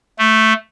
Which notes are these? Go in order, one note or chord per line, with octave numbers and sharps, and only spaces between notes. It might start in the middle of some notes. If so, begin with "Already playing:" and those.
A3